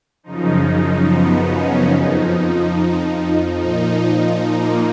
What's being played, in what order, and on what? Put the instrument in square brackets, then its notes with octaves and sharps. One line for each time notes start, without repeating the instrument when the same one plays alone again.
[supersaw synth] F#2 C#3 F3 D#4
B3
C#4
F2 F3 D#4
A#2 F3 D#4
A#3